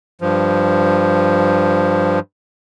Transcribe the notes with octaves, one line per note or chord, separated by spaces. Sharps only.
G2 F3